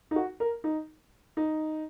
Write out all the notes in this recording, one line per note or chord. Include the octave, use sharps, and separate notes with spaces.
D#4
F#4
A#4
D#4
D#4